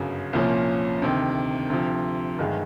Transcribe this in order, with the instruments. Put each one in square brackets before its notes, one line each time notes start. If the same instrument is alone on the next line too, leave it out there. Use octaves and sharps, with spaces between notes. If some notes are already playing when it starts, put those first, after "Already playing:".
Already playing: [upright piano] G1 F#2 C#3 F#3
C2 A#2 F3 A#3 C#4
D2 C3 D#3
D2 C3 F3
G1 G2 D#3 G#3